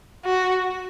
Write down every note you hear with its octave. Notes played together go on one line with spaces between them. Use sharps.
F#4